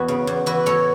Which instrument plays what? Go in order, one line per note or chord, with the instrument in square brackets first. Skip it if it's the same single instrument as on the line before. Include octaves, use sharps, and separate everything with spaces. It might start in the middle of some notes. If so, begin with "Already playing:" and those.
Already playing: [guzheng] E2 E3 F#4 B4
C#3
E2
E3 F#4 B4
A2 A4 C#5